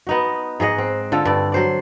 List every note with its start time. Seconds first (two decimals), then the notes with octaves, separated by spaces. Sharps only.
0.07 B3 D#4 F#4
0.60 G#2 G#4 D#5 F#5
0.78 C4
1.12 D3 F4 A4
1.25 G2 D5
1.52 F#3 C5 D5